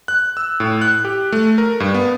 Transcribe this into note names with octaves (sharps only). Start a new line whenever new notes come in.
F#6
E6
A2
F#6
G4
A3
A#4
G2
B3